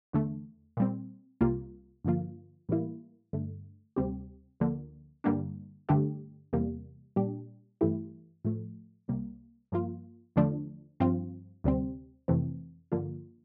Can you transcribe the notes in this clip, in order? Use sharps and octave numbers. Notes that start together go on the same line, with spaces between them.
E2 D3 A3
A#2 G3 C4
C2 C3 G3 A#3 F4
G2 D3 F3 A#3 F4
A2 E3 G3 A#3 E4
G2 D3 A3
D2 C3 G3 C4 G4
D2 D3 F3 A#3
G2 D3 G3 A#3 D4
G2 D3 A3 D4 G4
E2 C3 G3 A#3
A#2 G3 D4 G4
G2 E3 A3 E4 G4
A2 F3 A3
C2 C3 G3 A#3
G2 F3 A#3 F4
E2 D3 F3 A3 D4
G2 F3 C4 F4
D2 C3 G3 C4
F2 C3 E3 A3 C4
G2 D3 F3 A#3 F4